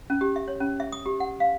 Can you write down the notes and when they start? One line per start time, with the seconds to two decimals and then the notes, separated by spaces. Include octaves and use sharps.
0.10 C#4
0.21 G4
0.36 E5
0.48 C#5
0.60 C#4
0.80 E5
0.92 D#6
1.06 G4
1.20 F#5
1.40 F5